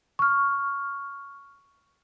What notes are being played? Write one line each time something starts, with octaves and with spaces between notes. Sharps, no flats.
C#6 F6